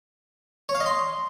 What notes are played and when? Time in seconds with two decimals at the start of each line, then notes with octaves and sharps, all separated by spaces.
0.69 C#5
0.75 F5
0.80 D#5
0.86 C6